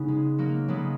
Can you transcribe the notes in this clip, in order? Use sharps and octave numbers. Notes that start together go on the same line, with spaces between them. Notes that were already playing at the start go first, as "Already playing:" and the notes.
Already playing: C#3 B3 C#4 D#4
G#3
F#3 A#3
C#3 F#3 G#3 B3